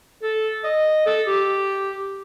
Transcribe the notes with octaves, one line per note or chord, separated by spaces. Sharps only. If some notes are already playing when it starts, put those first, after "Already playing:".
A4
D#5
A4
G4